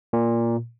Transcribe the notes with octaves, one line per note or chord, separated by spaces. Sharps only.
A#2